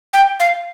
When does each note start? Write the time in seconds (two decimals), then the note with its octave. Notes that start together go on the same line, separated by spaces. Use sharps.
0.13 G5
0.40 F5